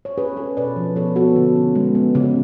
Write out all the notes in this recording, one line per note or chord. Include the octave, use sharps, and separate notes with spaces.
C#5
C#4 G#4 B4
C#4 A4 C#5
B2 B4 D5
F3
B3 A4 C#5
B3 F#4 A4
D3
C#4
G#3
B3
C#3